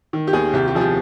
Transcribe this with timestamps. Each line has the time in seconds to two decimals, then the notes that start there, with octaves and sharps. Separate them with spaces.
0.13 D#3
0.27 G4
0.33 D#2 G#4
0.53 C2 G4
0.68 G4
0.75 F3 G#4
0.81 G4